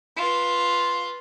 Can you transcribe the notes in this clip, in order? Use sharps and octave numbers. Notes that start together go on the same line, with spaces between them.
F4 B4